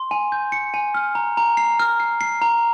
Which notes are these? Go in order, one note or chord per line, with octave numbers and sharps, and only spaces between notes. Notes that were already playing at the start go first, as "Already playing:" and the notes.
Already playing: C6
G#5
G6
C#7
G#5
F6
A#5
A#5
C7
F6
C7
C7
A#5